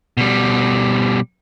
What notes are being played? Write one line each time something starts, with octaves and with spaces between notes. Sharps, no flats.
B2 G3